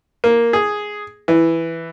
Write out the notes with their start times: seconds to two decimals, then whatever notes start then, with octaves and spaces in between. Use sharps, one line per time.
0.24 A#3
0.53 G#4
1.28 E3